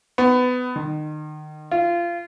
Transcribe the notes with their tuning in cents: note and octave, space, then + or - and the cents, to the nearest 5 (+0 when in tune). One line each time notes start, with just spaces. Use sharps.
B3 +20
D#3 -30
F4 -20